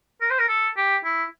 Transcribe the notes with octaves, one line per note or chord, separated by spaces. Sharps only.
A#4
C5
A#4
A4
G4
E4